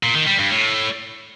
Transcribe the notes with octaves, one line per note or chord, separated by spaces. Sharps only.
A#2
D#3
G3
G2
A2